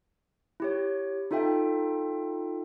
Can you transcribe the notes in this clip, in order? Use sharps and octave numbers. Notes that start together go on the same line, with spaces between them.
E4 G4 C#5
D#4 F4 A4 E5 G5